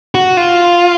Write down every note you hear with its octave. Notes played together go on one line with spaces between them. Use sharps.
F#4
F4